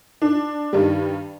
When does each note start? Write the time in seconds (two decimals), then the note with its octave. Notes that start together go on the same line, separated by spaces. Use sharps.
0.22 D4
0.73 G2 D#3 G3